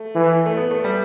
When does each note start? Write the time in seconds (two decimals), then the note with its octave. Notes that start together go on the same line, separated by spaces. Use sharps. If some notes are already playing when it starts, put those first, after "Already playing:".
Already playing: A3
0.15 E3
0.46 A3
0.57 B3
0.71 A3
0.84 G3